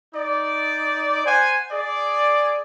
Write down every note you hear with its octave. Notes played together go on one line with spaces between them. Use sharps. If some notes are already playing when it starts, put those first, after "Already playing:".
D#4 D5
C5 F#5 G#5
G#4 D5